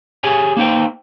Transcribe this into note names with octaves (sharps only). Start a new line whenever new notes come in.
G4 G#4 C#5 G#5
A#3 D#4 C5 G5